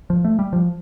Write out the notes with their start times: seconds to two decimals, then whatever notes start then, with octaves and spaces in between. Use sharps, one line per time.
0.10 F3
0.24 A3
0.39 G3
0.53 F3